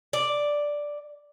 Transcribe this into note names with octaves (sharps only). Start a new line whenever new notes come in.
D5